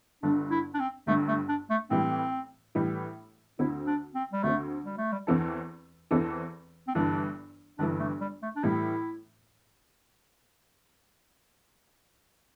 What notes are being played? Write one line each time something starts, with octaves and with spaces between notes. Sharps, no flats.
G1 G2 D3 D4
E4
D4
C4
G1 G2 D3 A3
A3
D4
A3
A2 E3 G3 C4
A2 E3 G3
D2 D3 C4 E4
D4
C4
G3
D2 D3 A3 C4
G3
A3
G3
E2 E3 C4 A4
E2 E3 C4 A4
C4
G1 G2 E3 D4
G1 G2 E3 D4
A3
G3
A3
D4
A2 E3 G3 E4